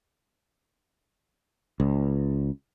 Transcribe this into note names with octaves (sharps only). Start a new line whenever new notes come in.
C#2